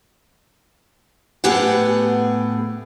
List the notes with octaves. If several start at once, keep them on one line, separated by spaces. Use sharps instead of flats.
A2 B3 G4 G#4 F#5